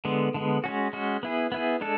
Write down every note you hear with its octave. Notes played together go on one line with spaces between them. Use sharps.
D3 G#3 B3
D3 G#3 B3
G#3 C#4 F#4
G#3 C#4 F#4
B3 E4 G#4
B3 E4 G#4
G#3 D4 A4